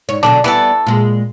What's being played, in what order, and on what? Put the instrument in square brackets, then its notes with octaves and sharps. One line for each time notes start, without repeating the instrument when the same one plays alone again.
[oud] G#2 C#5
[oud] B2 D3 F#3 [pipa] D4
[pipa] E3 A4 [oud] G3 B3
[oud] A#2 G#3